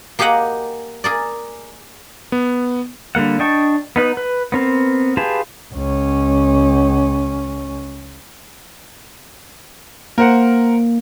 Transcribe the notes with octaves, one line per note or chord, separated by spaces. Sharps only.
A#3 G4 G#4 D#5 F#5 A#5
G#4 A#4 D5
B3
D3 G3 A#3 F#5
D4 D#5 G5 A5 C#6
B3 D#4 B4
B4
B3 C4 A#4
F4 G4 G#4 B4 A5
C#2 C#4
A#3 A#4 C5 F#5